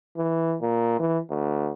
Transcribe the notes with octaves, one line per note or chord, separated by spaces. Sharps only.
E3
A#2
E3
D2